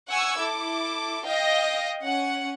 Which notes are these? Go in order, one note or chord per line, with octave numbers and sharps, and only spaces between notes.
F#5 G#5 C#6 E6 G#6
E4 A4 D6
D#5 F5 G5 A#6
C#4 F#5